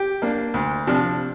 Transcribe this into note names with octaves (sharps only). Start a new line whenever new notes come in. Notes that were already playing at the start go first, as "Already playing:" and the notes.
Already playing: G4
A#3 D4
D2
C3 F3 D4